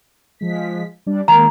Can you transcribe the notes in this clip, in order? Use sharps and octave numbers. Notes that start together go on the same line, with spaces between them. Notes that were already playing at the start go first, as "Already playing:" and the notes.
F3 G#3 B6
G3 D4 D5
D#3 G#3 A#3 A#5